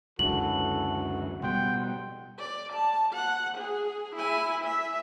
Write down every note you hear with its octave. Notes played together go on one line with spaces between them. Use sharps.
C#2 F#2 D3 E3 F#4 A4 F#7
B2 G3 F#5 G5 C6
D5
A5
F#5
G#4
E4 G#5
E5